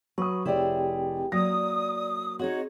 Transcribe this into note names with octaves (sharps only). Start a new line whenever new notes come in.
F#3 B4 C#6 D#6
F1 C4 E4 G4 G#4 C#5 D5 G5
F#3 A#3 D5 D#6 A#6
C4 D#4 F#4 G#4 C#5 D#5